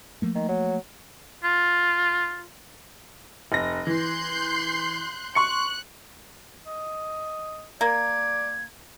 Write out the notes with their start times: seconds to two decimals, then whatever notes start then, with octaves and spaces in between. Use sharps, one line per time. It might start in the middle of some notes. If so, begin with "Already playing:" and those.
0.22 F3 A3 A#3
0.35 D#3
0.49 F#3
1.44 F4
3.52 F1 A#6
3.87 E3 C6 F#6 G6
5.35 C6 C#6 F#6 C#7
6.67 D#5
7.81 A#3 D5 G#6